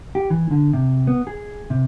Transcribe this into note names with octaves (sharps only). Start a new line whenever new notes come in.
G4
E3
D3
C3
B3
G#4
C3